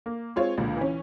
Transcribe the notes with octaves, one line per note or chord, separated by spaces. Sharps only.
A#3
G#3 C4 F4 C#5
C#2 A#2 D3
E3 C#4